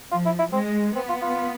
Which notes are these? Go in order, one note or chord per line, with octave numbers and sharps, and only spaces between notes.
F3 F4
E4
E4
G#3 C4
B3 C4
F4
F4